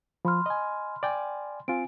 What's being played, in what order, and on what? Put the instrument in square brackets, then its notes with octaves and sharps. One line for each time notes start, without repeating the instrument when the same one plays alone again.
[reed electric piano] F3 [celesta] B5 C6 F6
[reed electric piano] D#5 G#5
D5 G5 G#5
[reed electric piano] C4 F4 [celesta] G#5 D7